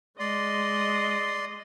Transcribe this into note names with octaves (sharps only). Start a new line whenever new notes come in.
G#3 D5 D#5 C6